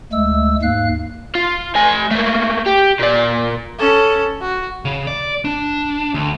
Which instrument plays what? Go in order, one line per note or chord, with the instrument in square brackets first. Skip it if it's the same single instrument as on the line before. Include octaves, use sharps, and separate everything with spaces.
[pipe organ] D2 G#3 A3 E6
D#2 G#2 F5 F#6
[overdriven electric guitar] F4
A3 G#5
A3 A#3
G4
A#2 D5
[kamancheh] C#4 A4
F#4
[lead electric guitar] C#3
D5
D4
D2